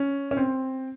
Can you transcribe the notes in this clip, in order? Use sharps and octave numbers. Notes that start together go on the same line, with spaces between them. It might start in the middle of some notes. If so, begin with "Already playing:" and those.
Already playing: C#4
C#4
C4